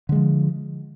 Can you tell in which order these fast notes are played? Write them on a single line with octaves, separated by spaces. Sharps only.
D3 G#3 F3